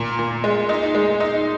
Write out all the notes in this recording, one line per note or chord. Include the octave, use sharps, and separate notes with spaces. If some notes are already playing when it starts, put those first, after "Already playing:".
Already playing: A#2
A#2
G#3
D#4
G#3
D#4